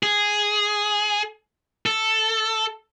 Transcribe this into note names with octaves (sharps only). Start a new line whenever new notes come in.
G#4
A4